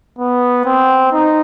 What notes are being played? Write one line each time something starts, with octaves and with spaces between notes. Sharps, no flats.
B3
C4
D#4